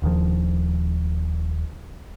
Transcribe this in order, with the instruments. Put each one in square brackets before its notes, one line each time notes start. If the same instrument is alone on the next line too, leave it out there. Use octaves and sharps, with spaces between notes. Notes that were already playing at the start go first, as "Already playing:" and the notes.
[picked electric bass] D#1 D#2 D#3 F3